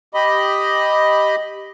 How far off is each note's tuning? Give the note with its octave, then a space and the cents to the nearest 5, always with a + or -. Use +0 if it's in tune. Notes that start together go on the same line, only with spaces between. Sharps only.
G4 +0 D#5 +0 B5 +0